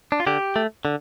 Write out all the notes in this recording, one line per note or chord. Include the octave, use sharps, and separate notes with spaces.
D4
F4
D3 G4
A3
D3